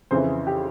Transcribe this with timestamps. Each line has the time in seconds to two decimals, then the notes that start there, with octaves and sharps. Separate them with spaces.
0.11 F2 C#3 E3 C5
0.47 G4